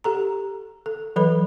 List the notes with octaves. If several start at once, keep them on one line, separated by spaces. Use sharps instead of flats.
G4 A4 A#5
A4
E3 F#3 A4 B4 B5